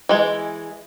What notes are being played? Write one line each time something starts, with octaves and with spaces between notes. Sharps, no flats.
E3 G#3